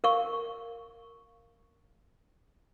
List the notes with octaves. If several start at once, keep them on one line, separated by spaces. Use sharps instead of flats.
A#4 F5 C#6